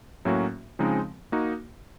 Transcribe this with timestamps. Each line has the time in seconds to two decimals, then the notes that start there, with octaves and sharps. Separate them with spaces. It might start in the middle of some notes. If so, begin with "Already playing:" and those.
0.25 A2 F#3 A#3 C#4 F#4
0.79 C#3 F3 G#3 C4 D#4
1.32 A#3 D#4 F#4